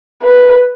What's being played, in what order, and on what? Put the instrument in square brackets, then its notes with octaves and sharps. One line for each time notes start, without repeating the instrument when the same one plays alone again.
[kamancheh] B4